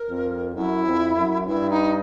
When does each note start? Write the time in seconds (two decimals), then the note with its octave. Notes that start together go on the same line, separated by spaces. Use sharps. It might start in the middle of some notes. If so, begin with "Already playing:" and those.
Already playing: A#4
0.09 F2
0.55 F#2 E4
0.86 F2
1.16 F#2
1.47 G2 E4
1.70 D#4